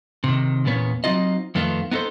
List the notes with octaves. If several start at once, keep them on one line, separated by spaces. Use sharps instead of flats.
C3 D#3
E2 A#2 B3 C#4
F#3 C4 D#4 F4 D#5
F2 D#3 A3 B3 F4
B3 D#4 F4 A4 C5